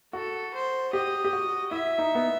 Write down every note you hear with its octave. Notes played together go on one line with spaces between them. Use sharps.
F#4 A4
C5
G4 D#5
G4
F#4
E4 E5
D#4
B3